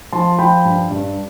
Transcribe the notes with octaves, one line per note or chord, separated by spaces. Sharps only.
F3 A5 C6
F3 G5 B5
G2
G2